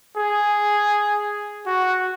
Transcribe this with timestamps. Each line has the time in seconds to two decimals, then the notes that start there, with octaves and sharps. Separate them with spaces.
0.18 G#4
1.66 F#4